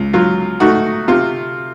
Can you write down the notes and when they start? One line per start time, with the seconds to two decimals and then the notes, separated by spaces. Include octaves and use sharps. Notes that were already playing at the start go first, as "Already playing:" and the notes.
Already playing: C#2
0.13 F#3 F4
0.60 A3 D#4 F#4
1.08 C3 F4